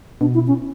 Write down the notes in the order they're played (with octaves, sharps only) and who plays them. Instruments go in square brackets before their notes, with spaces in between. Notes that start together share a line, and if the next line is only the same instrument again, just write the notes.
[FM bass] B2 [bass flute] D4
[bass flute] E4
C#4